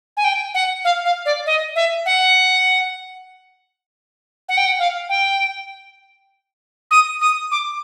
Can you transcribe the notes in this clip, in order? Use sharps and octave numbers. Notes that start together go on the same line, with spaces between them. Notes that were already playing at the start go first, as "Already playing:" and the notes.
G#5
G5
F#5
F5
F5
D5
D#5
E5
F#5
F#5
G5
F#5
F5
G5
D#6
D#6
D6